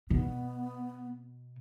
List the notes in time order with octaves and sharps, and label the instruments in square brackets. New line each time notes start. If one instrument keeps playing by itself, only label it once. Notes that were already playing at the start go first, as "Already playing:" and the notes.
[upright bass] B2 [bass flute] B3